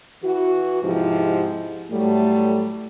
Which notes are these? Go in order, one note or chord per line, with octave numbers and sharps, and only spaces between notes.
E3 F#4
G#2 C3 F3 E4 G4
A2 F#3 G3 A3